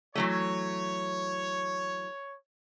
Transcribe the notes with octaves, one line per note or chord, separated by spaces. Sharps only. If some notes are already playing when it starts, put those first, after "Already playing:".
E3 F#3 A3 C#5